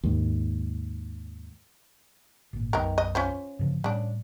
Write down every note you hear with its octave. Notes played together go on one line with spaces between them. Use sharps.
D#2 G#2
G#1 A#2
B1 F#2 B2 D#3 A#4
D#5
C#4 F4 C5
G2 C#3 F3
A2 C#3 G3 D4